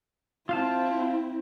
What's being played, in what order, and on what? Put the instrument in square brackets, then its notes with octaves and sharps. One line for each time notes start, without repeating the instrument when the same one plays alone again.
[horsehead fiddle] C4 E4 [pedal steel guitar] F4 F5 A5